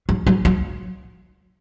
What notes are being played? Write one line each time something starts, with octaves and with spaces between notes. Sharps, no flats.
F#3
F#3
F#3